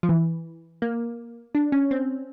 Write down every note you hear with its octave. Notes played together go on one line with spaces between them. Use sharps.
F3
E3
A#3
D4
C#4
C4